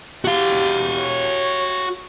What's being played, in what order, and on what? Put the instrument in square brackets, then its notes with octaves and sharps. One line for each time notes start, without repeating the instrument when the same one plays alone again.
[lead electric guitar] F#4 F5 [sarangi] G4
[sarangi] C#5